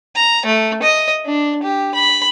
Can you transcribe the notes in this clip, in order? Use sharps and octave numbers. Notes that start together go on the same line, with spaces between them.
A#5
A3
D#5
D4
G4
B5